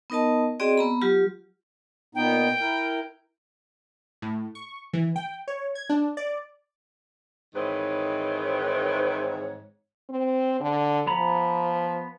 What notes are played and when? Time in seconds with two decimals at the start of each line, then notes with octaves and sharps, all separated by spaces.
0.10 B3 D#4 A#4 D#5 A5
0.60 C4 F#4 G#4 D5 D#5 G5
0.78 B3 A#5 B5
1.02 F#3 F4 G4
2.15 A#2 B3 D#4 G5
2.60 E4 A#4
4.22 A2
4.55 C#6
4.93 E3
5.16 G5
5.48 C#5
5.75 G#6
5.90 D4
6.17 D5
7.55 G#2 D#3 E3 C4 B4 C#5
10.10 C4
10.60 D3
11.07 F3 B3 A#5 B5